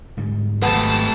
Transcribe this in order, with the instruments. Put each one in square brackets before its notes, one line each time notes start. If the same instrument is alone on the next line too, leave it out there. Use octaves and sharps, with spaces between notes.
[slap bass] G#2 D3 G3
[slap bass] G#1 F#3 [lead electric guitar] C3 A3 [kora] B3 [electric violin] A5